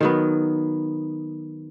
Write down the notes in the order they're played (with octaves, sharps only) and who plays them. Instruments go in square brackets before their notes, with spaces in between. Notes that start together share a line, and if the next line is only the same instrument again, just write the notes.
[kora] D#3 F#3 B3